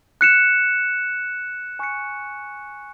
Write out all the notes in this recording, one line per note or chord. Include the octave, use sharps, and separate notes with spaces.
F#6 C#7 E7
G#5 C#6 F#6 C#7